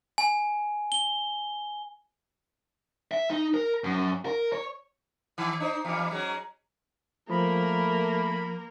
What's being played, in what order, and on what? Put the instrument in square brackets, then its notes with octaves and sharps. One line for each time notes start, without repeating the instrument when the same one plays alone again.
[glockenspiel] G#5
G7
[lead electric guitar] E5
D#4
A#4
F#2
A#4
C#5
[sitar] D#3
D4 D#4 C5
E2 G3
F#3 G#3 C#4
[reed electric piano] F3 [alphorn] A3 [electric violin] A#3 A#4 [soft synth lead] B5